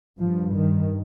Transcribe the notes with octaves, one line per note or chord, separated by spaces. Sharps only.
G2 F3
D#3